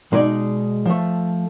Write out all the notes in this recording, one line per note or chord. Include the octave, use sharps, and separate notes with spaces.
B2 G#3 D#4 G#4 D5
F3 A3